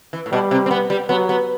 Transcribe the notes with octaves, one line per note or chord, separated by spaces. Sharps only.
E3
A2
B2 G3
C3
C4
B3
G3
F#3 B3
B3